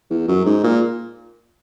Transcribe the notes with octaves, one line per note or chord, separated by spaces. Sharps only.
E2
F#2
G#2
A#2